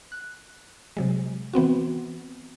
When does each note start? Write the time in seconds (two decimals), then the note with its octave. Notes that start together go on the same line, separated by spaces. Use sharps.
0.12 F#6
0.97 C3 F#3 G#3
1.53 E3 B3 C4 F#4